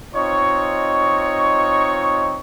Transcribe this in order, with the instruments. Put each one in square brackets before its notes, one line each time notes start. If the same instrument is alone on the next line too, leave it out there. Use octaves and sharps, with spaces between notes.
[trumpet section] C4 D#4 F4 C#5 D#5 C#6